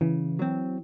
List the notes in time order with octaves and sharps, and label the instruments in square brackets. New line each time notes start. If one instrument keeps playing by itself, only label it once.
[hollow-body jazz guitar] C#3 [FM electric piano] E3
[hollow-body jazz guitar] F#3 C4